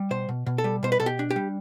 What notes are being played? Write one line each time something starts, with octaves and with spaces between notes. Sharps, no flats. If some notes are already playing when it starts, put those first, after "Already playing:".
Already playing: G3
B2 C5
B2
B2
A4
G3
B2 C5
B4
B2 A4
G4
D4
G4
G3